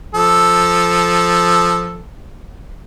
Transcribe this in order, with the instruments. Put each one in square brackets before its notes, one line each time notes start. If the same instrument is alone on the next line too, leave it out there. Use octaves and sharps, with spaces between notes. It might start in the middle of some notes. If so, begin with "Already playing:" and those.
[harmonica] F3 A4